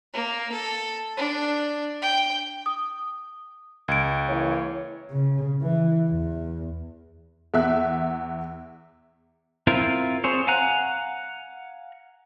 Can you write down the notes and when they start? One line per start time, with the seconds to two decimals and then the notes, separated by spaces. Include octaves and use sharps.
0.14 A#3
0.52 A4
1.17 D4
2.02 G5
2.66 D#6
3.88 C#2 G#6 D7
4.28 E3 A#3 C#5
5.12 C#3
5.62 E3
6.10 E2
7.54 E2 E5 F#6
9.67 C4 E4 F4 A#4
10.24 C4 G#4 C5 C#5
10.47 F5 F#5 G#5 A#5 F#6